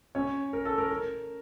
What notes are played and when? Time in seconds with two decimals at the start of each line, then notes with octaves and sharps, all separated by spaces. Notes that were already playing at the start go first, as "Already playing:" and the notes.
0.15 C#4 C#5
0.53 A#4
0.65 A4
0.78 A#4
0.90 A#4